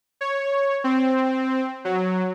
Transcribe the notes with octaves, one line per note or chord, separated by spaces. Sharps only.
C#5
C4
F#3